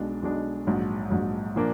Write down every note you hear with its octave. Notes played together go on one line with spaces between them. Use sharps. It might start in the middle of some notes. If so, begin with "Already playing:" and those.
Already playing: B1 B2 G#3 D4
B1 B2 G#3 D4
A#1 G#2 F#3
A#1 G#2 F#3
A#2 F3 A#3 D4